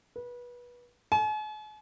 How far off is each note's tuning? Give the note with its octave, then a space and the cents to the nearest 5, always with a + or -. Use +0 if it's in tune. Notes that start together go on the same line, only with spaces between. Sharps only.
B4 -25
G#5 +45